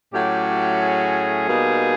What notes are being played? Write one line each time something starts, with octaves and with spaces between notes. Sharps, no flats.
A2 F#3 A3 C#4 G4
G4
G#4
B2 G3 A#3 D#4